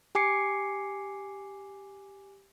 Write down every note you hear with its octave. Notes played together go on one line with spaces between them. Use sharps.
G4 G#5 D6 C7 C#7